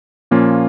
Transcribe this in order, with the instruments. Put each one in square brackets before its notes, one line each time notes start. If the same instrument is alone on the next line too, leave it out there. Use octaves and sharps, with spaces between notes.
[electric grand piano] A#2 F3 A#3 C#4 F4